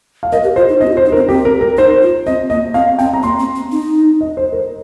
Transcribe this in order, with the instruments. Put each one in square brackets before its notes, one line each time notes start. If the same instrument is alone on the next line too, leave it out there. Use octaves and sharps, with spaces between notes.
[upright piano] F5
[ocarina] A#4 [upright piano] D#5
[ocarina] G4
[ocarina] F4 [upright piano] C5
[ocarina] D#4
[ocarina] C4 [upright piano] D#5
[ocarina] G4
F4
[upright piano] C5
[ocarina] D#4
[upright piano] A#4
[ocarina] C4
[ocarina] C4 [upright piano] G4
[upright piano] A#4
A#4
[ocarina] D#4 [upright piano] C5
[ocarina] F4
[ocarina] C4 [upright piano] D#5
[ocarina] A#3 [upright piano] D#5
[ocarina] C4 [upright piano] F5
[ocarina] C4 [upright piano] G5
[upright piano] A#5
[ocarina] A#3 [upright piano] C6
[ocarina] C4
C4
D#4
[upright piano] D#5
C5
A#4